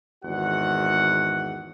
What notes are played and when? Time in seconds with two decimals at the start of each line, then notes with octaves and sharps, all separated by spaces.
0.25 G#1 E2 F#4 F#5